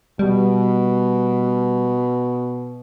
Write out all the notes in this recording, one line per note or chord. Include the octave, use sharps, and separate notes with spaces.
B2 G3